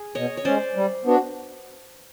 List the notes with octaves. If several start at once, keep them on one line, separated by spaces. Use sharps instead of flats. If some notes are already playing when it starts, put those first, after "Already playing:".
Already playing: G#4
B2 C#5 D#5
C#5
G#3 C#4 C5 D5
G3
B3 D4 F#4